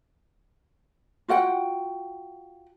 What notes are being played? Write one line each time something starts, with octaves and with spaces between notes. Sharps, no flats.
F4 F#4 F#5 G5